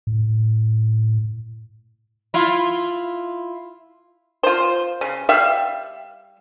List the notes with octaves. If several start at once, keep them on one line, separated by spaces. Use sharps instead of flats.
A2
E4 F4
F4 C5
C#3
G3 E5 F5